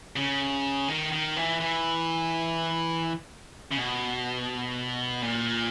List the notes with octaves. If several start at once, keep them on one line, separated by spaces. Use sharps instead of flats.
C#3
D#3
D#3
E3
E3
C#3
B2
A#2